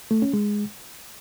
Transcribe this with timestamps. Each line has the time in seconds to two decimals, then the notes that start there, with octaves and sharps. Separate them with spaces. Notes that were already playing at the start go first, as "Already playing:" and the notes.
0.11 A3
0.22 C#4
0.33 G#3